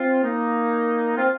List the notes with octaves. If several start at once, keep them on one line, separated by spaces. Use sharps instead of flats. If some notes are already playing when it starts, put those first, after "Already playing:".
Already playing: C4 F4
A#3 D#4
C4 F4